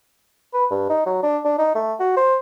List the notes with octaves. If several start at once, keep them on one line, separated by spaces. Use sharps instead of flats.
B4
G2
D#4
F#3
D4
D4
D#4
A3
F#4
C5